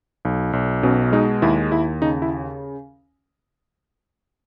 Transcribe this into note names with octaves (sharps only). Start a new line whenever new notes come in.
B1
B1
B2 C#4
G#3 D#4
D#2 E4
D#2 E4
C#3 D#4
E4